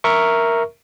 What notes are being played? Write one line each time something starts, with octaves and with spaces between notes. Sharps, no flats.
A#4 E5 C#6